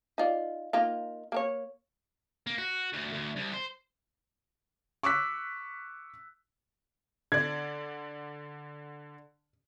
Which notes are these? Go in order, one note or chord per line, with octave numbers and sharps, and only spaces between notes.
D#4 F4 D5
A#3 D#4 F4
A#3 A#4 C#5
A#3
F#4
D2
D2
C2
C5
C#6 D6 E6 F#6 B6
D3 D5 G#6